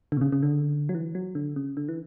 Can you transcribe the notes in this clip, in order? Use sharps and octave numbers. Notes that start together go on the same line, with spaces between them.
D3
B2
C#3
C#3
D3
F#3
E3
F#3
D3
C#3
D3
E3